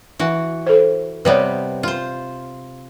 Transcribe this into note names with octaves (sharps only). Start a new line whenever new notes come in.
E3 F#4
A4 C5
C3 G3 B3 B4 C#5
F4 C5